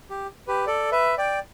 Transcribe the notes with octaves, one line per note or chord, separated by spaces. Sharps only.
G4
G4 B4
A4 D5
B4 E5
D5 G5